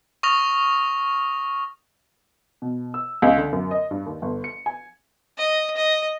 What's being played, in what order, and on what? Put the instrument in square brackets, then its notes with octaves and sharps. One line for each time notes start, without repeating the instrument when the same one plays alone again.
[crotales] C#6 D#6 F6 A#6 F7
[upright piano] B2
E6
C#2
D3
F#2
D#5
G2
D#2
G1
C#7
G#5
[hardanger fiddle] D#5
D#5